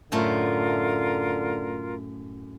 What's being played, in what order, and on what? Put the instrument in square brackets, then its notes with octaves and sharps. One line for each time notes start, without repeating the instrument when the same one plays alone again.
[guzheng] F#2 A2 A3 [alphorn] D3 [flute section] F4 A#4